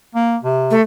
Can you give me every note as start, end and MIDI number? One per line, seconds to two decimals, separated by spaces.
0.15 0.37 58
0.44 0.76 48
0.71 0.81 57